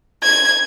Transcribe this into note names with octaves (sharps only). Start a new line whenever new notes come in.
G#6